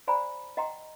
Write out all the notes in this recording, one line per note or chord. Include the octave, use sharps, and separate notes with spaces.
C5 D5 F#5 G#5 A#5 B5
D#5 F#5 G5 A#5 C6